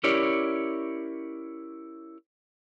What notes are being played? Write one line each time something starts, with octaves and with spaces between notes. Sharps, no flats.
C#4 E4 G4 A#4 C#5 D5